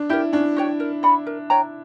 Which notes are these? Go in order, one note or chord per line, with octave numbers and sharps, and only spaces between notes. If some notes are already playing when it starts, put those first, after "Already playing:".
Already playing: D4
E4 G4 A#4
C#4 D4
F#4 C#5 G5
A#4
D5 F#5 B5
A#4
C#5 G5 A#5